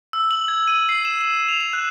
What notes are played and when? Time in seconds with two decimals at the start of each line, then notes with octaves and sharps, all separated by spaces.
0.13 E6
0.31 F#7
0.48 G#6
0.68 D#7
0.89 C7
1.05 E7
1.21 E7
1.49 F7
1.61 E7
1.73 F#6